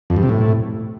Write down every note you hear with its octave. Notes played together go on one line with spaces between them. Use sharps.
F2
G2
C3
A2